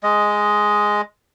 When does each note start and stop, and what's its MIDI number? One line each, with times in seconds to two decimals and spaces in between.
0.03 1.01 56
0.03 1.01 75